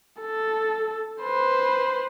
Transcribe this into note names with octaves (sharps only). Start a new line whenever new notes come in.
A4
B4 C5